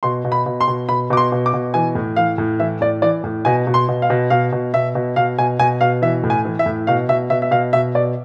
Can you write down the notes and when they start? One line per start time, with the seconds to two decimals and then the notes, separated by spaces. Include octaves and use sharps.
0.03 B2 C6
0.25 B2
0.32 B5
0.46 B2
0.61 C6
0.68 B2
0.89 B2 B5
1.10 B2 D6
1.17 C6
1.32 B2
1.46 D6
1.54 B2
1.74 E3 G#5
1.95 A2
2.16 E3 F5
2.38 A2
2.60 E3 E5
2.81 A2 D5
3.02 E3 D5
3.24 A2
3.45 B2 G#5
3.67 B2
3.74 C6
3.89 B2
4.02 F5
4.10 B2
4.30 B2 F5
4.52 B2
4.74 B2 E5
4.95 B2
5.16 B2 F5
5.38 B2 G#5
5.59 B2 G#5
5.81 B2 F5
6.02 E3 E5
6.24 A2
6.30 G#5
6.45 E3
6.59 E5
6.66 A2
6.87 B2 F5
7.09 B2 E5
7.30 B2 E5
7.42 E5
7.51 B2 F5
7.73 B2 E5
7.95 B2 D5